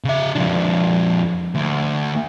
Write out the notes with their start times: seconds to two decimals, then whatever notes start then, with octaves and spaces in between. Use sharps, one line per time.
0.04 C#3 E5
0.35 F2 D4
1.55 D2